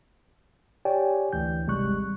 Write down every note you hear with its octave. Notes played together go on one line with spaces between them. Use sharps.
G4 C#5 D5 G5 G#5
D2 E3 G6
G#1 C3 G3 G#3 C#6 F#6